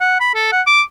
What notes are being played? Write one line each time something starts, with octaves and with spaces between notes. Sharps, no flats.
F#5
B5
A4
F#5
D6